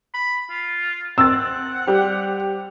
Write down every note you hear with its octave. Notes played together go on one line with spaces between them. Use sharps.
B5
F4
C4 F#5 C6 E6 A6
G3 G4 C5